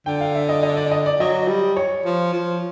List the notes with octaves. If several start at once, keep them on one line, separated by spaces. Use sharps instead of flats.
D3 G5
F5
E5
D#5
D#5
D5
D#5
D5
F#3 D#5
G3
C#5
F3
F3